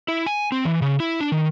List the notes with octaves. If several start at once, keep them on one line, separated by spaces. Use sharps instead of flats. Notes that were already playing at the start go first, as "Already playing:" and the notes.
E4
G#5
C4
E3
C#3
E4
D4
D#3